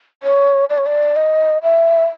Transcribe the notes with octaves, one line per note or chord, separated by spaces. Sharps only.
C#5
D5
C#5
D5
D#5
E5